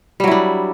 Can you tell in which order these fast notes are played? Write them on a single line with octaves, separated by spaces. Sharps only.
G3 F#3 E4 D4